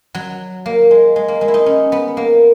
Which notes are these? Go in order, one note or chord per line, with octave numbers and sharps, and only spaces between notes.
F#3
A#3
G#3
G#3
A#3
G#3
E4
D#4
C#4
B3
A#3